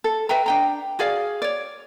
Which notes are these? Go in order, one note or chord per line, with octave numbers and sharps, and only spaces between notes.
A4
B4 E5 G5 A#5
D4 G5 A#5
F#4 G#4 D5 F5
C#5 D5